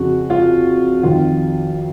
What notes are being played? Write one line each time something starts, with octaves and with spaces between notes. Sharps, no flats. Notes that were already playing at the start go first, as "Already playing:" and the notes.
Already playing: F2 C#3 F#4
F4
F2 D#3 F4